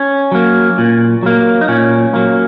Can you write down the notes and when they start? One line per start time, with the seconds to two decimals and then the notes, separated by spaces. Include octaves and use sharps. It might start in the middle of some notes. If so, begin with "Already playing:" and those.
Already playing: C#4
0.31 F#3 A#3
0.78 A#2
1.23 F#3 A#3
1.61 D#4
1.68 A#2 C#4
2.14 F#3 A#3